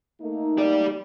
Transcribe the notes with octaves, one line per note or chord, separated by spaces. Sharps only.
A3 A#3 D#4
G4 D5